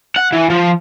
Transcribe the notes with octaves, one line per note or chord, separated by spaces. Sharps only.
F#5
E3
F3